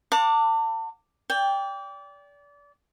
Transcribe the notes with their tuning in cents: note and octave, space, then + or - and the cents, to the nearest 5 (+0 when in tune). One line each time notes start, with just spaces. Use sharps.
F#5 -30 A5 +35 D6 +0
D5 -30 G5 +15